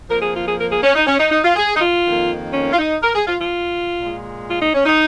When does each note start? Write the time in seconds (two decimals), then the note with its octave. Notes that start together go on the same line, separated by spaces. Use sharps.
0.10 F2 F3 A#3 A#4
0.22 G#4
0.35 F4
0.47 G#4
0.58 A#4
0.71 G#4
0.83 C#4
0.95 D#4
1.07 C#4
1.19 D#4
1.31 D#4
1.44 F4
1.56 G#4
1.76 D#4
1.80 F4
2.05 F2 D#3 A#3
2.53 C#4
2.73 F4
2.79 D#4
3.02 A#4
3.15 G#4
3.27 F4
3.40 F4
4.00 A#2 G#3
4.48 F4
4.62 D#4
4.74 C#4
4.86 D#4